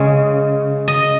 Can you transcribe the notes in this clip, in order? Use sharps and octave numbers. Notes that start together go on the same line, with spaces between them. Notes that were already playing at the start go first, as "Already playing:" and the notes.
Already playing: C#3 G#3 C#5
D#5